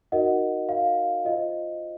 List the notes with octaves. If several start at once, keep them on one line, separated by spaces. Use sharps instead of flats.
D#4 F#4 A#4 D#5 F#5
F5
F4 C5 D#5